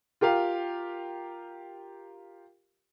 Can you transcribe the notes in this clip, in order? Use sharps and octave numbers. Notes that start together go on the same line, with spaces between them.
F4 G4 A#4 F5